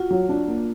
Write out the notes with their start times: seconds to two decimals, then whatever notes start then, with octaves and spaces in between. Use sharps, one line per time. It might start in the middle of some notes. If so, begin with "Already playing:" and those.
Already playing: F4 F#4
0.11 F#3
0.29 D4
0.48 A#3